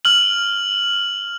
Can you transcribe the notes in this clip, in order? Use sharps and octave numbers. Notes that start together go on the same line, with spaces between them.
F6 F#7